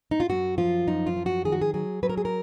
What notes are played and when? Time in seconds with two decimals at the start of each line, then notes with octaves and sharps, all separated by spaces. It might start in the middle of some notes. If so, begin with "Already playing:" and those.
0.11 D#4
0.20 F4
0.29 F#2 F#4
0.58 F3 F4
0.87 F#2 D#4
1.07 F4
1.17 F3
1.26 F#4
1.45 D#3 G#4
1.52 F#4
1.61 G#4
1.74 F#3 G#4
2.03 F#3 B4
2.09 A#4
2.17 G#4
2.25 A#4